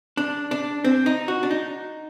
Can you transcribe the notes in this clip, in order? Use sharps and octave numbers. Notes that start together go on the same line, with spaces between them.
D4
D4
C4
D#4
F#4
D4
D#4